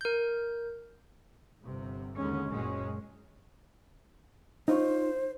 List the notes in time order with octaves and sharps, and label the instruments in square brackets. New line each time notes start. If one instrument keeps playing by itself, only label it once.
[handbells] A#4 G6
[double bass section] G1 C3
D#2 D3 G#3 C#4
F#1 A#2 G#3 C#4
[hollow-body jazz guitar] D#4 F4 C#5 [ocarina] C5